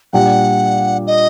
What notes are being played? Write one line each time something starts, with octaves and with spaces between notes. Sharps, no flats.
A#2 G3 D4 G4 F#5
D#5